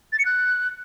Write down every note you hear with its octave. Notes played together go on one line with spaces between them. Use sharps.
A6
C#7
F#6